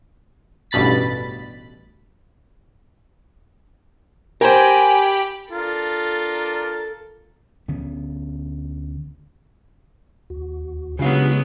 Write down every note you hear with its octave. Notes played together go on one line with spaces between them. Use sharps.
A1 G2 B2 B5 A6 B6
G4 A#4 C5 G5 G#5 B5
D4 F4 A4 A#4
D2 D3 B3 C#4
D#2 F#4
C#3 F#3 G#3 B3 D4 F4 G4 F5